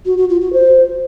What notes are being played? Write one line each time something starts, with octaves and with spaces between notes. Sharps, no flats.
F#4
F#4
F4
F#4
C5